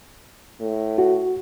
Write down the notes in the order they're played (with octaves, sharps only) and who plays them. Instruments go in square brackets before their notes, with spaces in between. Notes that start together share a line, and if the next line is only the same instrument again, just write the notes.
[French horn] A2
[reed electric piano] F#4